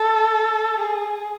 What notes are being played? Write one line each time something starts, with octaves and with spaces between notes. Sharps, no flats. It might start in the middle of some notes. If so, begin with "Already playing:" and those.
Already playing: A4
G#4